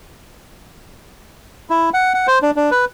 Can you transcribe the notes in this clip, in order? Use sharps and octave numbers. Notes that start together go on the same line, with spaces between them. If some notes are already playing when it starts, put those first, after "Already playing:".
E4
F#5
F#5
C5
D4
D4
B4